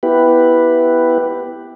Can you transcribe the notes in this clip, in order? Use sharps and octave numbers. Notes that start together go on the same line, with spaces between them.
B3 E4 G4 B4